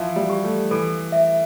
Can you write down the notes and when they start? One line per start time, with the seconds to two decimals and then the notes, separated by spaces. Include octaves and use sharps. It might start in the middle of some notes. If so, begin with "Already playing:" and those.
Already playing: E3 F3 E5
0.16 G3
0.30 G4
0.44 A3
0.71 E3 A4
1.12 E5